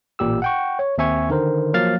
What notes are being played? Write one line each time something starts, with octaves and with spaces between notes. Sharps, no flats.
A1 A#2 G4 E6
F#5 G5 C#6
C#5
D#2 C4 E5 G#5 C#6 G#6
D3 D#3 A#4 C5
F3 F#3 A#3 F5 F6 A6